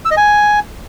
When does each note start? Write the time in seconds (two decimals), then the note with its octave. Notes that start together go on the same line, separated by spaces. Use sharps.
0.05 E6
0.11 D#5
0.17 G#5